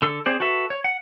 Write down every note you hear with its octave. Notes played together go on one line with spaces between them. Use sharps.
D3 A4
C4 G#4 C5 D5
F#4 A4 B4 E5
C#5
F#5